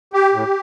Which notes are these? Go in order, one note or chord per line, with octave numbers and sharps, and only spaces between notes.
G4
A2